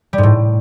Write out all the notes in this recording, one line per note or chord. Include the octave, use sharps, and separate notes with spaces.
G3
G#2
A2